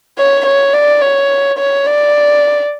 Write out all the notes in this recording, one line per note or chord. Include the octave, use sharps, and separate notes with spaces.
C#5
C#5
D5
C#5
C#5
D5